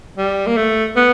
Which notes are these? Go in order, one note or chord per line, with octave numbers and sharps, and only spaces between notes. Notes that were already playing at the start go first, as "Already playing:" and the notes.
G3
A#3
A3
B3